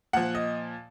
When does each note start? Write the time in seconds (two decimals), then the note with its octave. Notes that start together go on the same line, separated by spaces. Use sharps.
0.13 A#2 F3 F#5
0.35 D#5